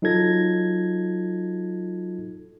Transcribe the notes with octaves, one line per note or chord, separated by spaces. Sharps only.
F#3 D#4 F4 A4 G#6 A#6